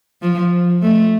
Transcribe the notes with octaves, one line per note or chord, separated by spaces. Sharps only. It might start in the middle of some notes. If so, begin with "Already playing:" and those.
F3
A3